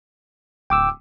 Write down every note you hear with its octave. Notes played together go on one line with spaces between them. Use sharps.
D1 G5 D6 E6